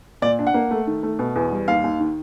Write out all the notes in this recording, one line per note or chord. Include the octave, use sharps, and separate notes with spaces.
A#2 D5
D4
F#5
A#3
A3
D#3
A3
B2
E2
G3
D#2 F5
D#2
D#3